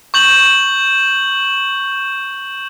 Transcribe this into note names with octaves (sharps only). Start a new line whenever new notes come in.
C#6 G6 F#7